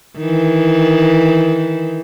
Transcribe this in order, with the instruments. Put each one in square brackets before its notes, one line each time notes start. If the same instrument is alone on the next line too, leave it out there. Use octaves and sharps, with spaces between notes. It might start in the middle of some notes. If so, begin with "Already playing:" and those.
[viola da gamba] D#3 E3